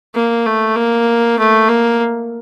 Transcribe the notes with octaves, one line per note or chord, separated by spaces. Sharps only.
A#3
A3
A#3
A3
A#3